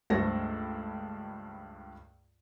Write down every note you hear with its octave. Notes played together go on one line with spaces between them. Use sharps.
C#2 G2 A3 A4 C5 A#6